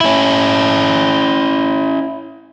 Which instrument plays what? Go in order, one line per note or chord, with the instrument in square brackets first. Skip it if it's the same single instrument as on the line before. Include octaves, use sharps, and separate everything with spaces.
[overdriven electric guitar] C#4 E4